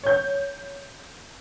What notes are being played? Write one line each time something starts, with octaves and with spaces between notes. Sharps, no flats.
C#5 G6